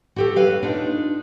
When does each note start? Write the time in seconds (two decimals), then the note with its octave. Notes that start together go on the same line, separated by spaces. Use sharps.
0.16 F#4 G4 A4
0.36 C#4 B4 F5
0.63 D4 D#4 F4